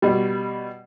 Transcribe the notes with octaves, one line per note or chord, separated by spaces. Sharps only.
B2 G3